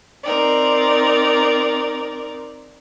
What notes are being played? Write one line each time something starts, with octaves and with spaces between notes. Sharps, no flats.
C4 D#4 A#4 D5